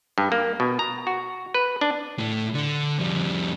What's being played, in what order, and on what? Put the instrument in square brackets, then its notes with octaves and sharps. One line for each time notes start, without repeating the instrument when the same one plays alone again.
[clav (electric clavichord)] G2
A#3
B2
A#5
F#4
B4
D4
[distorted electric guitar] A2 A3
D3 D4
F2 G3